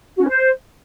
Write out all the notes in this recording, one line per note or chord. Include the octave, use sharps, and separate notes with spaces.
F#4
C#4
C5